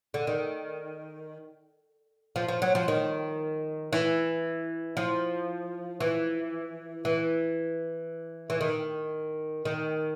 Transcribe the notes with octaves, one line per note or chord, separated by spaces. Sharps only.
D3
D#3
F3
F3
F#3
F3
D#3
E3
F3
E3
E3
E3
D#3
D#3